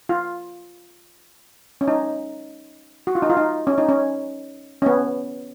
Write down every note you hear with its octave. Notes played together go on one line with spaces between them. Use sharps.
F4
C#4
D#4
F#4
F4
D#4
F4
D#4
C#4
D#4
C#4
C#4
B3